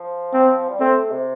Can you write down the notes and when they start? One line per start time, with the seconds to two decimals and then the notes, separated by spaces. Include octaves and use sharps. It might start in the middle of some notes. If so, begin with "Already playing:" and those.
Already playing: F3
0.33 C4
0.69 G3
0.80 A3 C4
1.12 C3